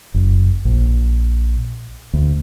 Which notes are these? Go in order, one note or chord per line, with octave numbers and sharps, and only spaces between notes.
F#1
A#1
D2